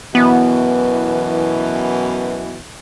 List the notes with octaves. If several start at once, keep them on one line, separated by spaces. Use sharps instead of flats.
F#2 B2 E3 B3